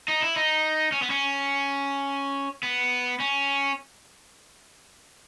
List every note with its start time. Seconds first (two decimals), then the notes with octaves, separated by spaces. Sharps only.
0.08 D#4
0.22 E4
0.36 D#4
0.92 C#4
1.02 B3
1.10 C#4
2.63 B3
3.20 C#4